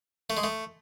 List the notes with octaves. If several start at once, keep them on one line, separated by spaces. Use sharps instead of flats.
A3
G#3
A3